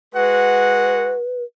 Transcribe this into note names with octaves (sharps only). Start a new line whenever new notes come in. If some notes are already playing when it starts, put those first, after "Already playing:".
G#3 F#4 B4 F#5